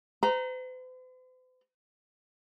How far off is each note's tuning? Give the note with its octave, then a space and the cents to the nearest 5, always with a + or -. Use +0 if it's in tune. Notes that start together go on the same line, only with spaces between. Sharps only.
C5 -45 A#5 +0